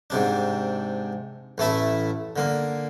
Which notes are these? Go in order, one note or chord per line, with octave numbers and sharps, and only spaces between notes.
G#2 C3 D4
A1 A3 E4 E5
D3 A#3